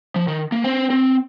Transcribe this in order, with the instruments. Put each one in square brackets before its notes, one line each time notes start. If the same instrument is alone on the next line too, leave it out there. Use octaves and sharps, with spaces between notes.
[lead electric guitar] F3
D#3
A#3
C4
C4